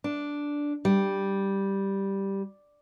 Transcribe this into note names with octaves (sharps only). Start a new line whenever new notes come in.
D4
G3